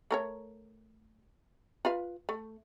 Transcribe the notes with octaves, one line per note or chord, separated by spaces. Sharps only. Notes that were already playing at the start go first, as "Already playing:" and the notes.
A3 A#4 C#5
F4 B4 F5
A3